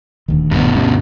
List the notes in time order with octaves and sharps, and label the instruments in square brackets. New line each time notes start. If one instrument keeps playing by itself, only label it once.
[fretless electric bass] D#1 D2 D#3
[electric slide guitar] G2 B2
[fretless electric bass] D2 G3 C#4